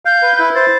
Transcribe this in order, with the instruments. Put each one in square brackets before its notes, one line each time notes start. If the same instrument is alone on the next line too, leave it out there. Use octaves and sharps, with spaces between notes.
[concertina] F5 [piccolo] G6
[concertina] B4
E4
[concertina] C5 [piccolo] A6